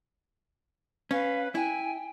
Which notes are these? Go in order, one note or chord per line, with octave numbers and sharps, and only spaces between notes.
C#4 B4 F5
E4 G5 G#5